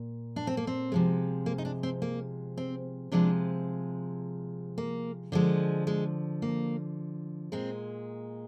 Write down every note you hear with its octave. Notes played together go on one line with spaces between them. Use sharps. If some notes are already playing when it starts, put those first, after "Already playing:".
Already playing: A#2
D4
C4
A#3
C4
C3 F3 G#3
A#3
D#4
D4
C4
A#3
C4
C3 F3 G#3 D4
A#3
D3 F3 G#3
G#3
A#3
A#2 G#3 C4